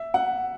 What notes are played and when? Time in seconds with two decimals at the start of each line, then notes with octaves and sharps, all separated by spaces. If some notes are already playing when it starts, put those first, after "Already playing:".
Already playing: E5
0.14 F#5